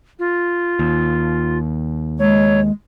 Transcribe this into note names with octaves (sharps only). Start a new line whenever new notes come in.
F4
D#2
G#3 C#5